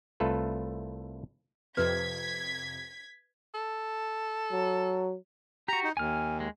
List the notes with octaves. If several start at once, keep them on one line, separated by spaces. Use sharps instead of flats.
C2 A3 F4 A4 B4
F2 C3 B4 G#6 B6
A4
F#3
F#4 G4 A#5
D#4
D#2 G#5 F6
G#3